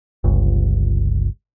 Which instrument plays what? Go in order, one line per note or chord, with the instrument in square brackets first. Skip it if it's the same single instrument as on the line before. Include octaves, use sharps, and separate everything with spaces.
[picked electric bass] G1 C#2